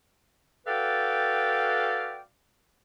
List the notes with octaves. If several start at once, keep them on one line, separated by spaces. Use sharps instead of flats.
F#4 A4 B4 D5 F5 G5